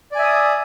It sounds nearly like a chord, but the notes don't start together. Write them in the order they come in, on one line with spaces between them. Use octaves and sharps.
D5 G#5 E5 D#6